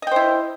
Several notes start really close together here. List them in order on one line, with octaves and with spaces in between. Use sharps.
D#5 G5 C5 E4